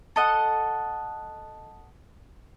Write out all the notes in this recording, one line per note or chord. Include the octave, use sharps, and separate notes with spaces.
A4 D#5 F#5